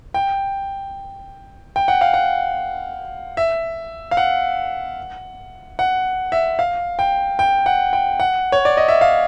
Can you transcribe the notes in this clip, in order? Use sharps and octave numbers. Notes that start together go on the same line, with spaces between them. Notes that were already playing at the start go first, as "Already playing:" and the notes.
G5
G5
F#5
F5
F#5
E5
F5
F#5
F#5
E5
F5
G5
G5
F#5
G5
F#5
C#5
D5
D#5
E5
F5